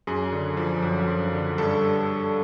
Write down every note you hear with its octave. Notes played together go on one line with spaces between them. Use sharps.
F#2 G#4
D3
F3
F#2
F#2
D3
G2 A4